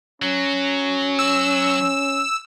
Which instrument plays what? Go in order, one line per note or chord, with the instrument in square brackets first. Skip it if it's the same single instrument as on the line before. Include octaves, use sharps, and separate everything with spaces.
[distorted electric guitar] F#3 [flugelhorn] C#4
[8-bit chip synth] E6